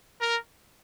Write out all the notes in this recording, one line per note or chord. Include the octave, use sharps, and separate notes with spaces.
A#4